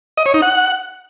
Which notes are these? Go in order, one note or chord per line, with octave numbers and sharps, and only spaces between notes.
D#5
C#5
D#4
F#5